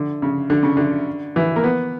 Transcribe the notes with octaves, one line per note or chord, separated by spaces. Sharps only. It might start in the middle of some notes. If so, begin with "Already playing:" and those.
Already playing: D3
C#3
D3
C#3
D3
E3
A#3
B3